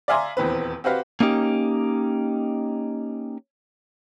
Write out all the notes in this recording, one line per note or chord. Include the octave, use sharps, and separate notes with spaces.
D5 E5 F5 G#5 A#5 C6
D#1 E2 C4 B4
C4 F#4 G4 B4 F5
A#3 C#4 D#4 G4